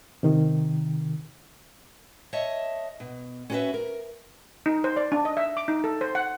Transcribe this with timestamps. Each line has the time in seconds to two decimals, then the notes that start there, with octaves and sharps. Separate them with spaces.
0.23 C3 D#3
2.33 C#5 D#5 E5 A5
3.00 B2
3.50 C#4 E4 F#4 G#4 B4 E5
3.74 A#4
4.66 D#4
4.84 C5
4.97 D5
5.12 D4
5.25 D#5
5.37 E5
5.57 D6
5.68 D#4
5.84 A4
6.01 C5
6.15 F#5